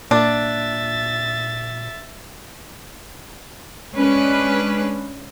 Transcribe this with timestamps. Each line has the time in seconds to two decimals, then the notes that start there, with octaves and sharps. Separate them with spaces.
0.11 A#2 D4 E5 A6
3.93 G#3 C#4 D4 B4